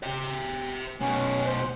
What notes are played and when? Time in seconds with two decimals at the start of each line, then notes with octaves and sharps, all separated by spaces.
0.03 C5 E5
1.00 F#2 B2 C#4
1.46 C5